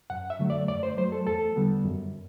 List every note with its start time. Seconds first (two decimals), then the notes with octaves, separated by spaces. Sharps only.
0.10 F#2 F#5
0.30 E5
0.39 D3 F#3 A3
0.50 D5
0.68 F#2 D5
0.83 C5
0.97 F#3 A3 C5
1.12 A4
1.27 E2 A4
1.56 D3 G3 B3
1.85 F#2